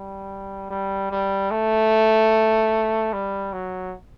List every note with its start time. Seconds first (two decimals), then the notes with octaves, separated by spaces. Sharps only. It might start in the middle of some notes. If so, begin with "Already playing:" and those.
Already playing: G3
0.70 G3
1.11 G3
1.51 A3
3.13 G3
3.53 F#3